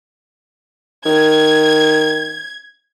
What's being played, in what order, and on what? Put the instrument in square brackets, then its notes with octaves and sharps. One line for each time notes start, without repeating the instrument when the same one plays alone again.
[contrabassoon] D#3 [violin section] G#6